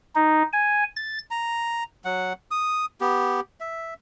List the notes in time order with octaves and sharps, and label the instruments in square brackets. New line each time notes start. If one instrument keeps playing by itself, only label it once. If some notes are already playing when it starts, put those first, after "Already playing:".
[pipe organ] D#4
G#5
A6
[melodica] A#5
F#3 F#5
D#6
B3 G4
E5